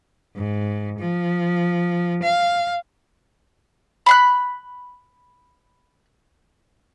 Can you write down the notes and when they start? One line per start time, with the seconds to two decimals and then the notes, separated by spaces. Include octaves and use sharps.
0.36 G#2
0.99 F3
2.23 F5
4.06 B5 C6 F#6